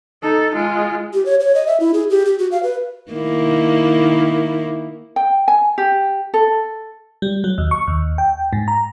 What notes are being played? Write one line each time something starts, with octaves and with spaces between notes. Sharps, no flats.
D#4 A4
G#3 F4
G4
C#5
C#5
D#5
E5
E4
G#4
G4
G4
F#4
F5
B4
D#3 A#3 E4
G5
G#5
G4
A4
G3
F#3
D#2
C#6
D#2
G5
G#2
A#5